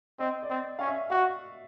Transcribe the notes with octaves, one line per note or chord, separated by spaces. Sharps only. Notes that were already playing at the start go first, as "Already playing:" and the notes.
C4 D#5
D5
C4
C#4 F5
E5
F#4 F5